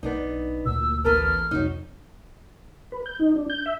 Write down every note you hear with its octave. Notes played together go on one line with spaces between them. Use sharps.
B1 B3 D4 D#4
B1
D2 A#2 E6
A1 B3 A4 A#4 F6
C2 F2 F#3 D#4
B4
G6
D#4
D4
G6
E5